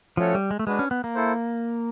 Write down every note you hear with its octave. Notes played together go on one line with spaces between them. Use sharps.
F3 A3 C#4 F#4 A4 C#5
G3
G#3
A3
G#3 D4 F#4 B4
C#4
B3
A#3
E4 A4 C5